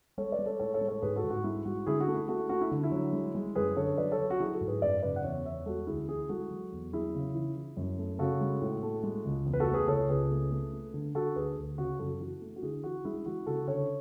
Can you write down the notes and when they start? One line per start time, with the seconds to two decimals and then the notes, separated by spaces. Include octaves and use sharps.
0.18 G#3 A4 C#5
0.32 B4 D5
0.39 G#3
0.46 A4 C#5
0.60 A2 A4 C#5
0.74 A4 C#5
0.81 G#3
0.88 A4 C#5
1.02 G#2 G#4 B4
1.16 F#4 A4
1.24 G#2
1.30 F#4
1.44 G#3 E4
1.65 G#3 F#4
1.87 D3 E4 G#4
2.00 F#4
2.08 A3
2.15 E4
2.28 A3 F#4
2.49 A3 F#4
2.61 E4
2.71 D3
2.83 E4
2.92 F#3
3.13 G#3
3.35 G#3
3.55 F#2 G#4 B4
3.77 D3 A4 C#5
3.97 F#3 B4 D5
4.12 A4 C#5
4.19 F#3
4.30 F#4
4.40 F#3 E4 G#4
4.53 F#4 A4
4.61 G#2
4.68 G#4 B4
4.82 F#2 B4 D5
5.02 C#3 B4 D5
5.16 F#5
5.24 E2 C#5 E5
5.45 E2 C#5 E5
5.66 G#3 F#4 A4
5.87 D2 E4 G#4
6.08 E3 E4 G#4
6.29 G#3 F#4 A4
6.50 F#3
6.72 E2
6.93 F#3 E4 G#4
7.15 C#3
7.35 E3
7.57 E3
7.77 F#2
7.99 A3
8.19 C#3 F#4 A4
8.41 G#3
8.61 A2
8.83 A3
9.03 G#3
9.25 C#2
9.46 E2
9.53 B4
9.60 F#4 A4
9.67 A3
9.74 G#4 B4
9.88 C#2 A4 C#5
10.09 C#2 G#4 B4
10.31 A3
10.52 A3
10.73 A3
10.94 D3
11.15 D3 F#4 A4
11.36 D2 G#4 B4
11.57 D2
11.78 C#3 F#4
11.99 F#2 F#4 A4
12.20 E3 F#4
12.42 A3
12.56 F#4
12.62 D3 E4 G#4
12.84 E3 F#4
13.05 G#3 E4 G#4
13.26 E3 F#4
13.46 C#3 F#4 A4
13.67 D3 A4 C#5